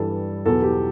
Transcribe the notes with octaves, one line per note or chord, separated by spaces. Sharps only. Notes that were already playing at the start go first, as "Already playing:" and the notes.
Already playing: G2 E3 G3 A4
E2 B2 F#3 A4
G4